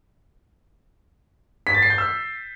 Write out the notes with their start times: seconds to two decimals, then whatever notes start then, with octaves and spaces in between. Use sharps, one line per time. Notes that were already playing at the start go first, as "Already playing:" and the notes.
1.67 B6
1.74 A6
1.82 C7
1.90 G6
1.98 E6